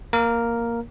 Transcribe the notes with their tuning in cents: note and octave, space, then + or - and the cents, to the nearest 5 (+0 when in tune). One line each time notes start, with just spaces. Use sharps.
A#3 +0 A#4 +0